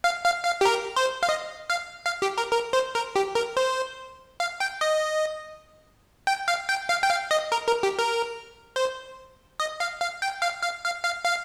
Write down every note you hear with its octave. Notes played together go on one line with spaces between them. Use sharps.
F5
F5
F5
G4
A#4
C5
F5
D#5
F5
F5
G4
A#4
A#4
C5
A#4
G4
A#4
C5
F5
G5
D#5
G5
F5
G5
F5
G5
F5
D#5
A#4
A#4
G4
A#4
C5
D#5
F5
F5
G5
F5
F5
F5
F5
F5